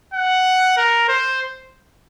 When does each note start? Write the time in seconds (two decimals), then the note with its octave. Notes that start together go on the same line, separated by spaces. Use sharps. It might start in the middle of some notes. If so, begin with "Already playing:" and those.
0.14 F#5
0.77 A#4
1.08 C5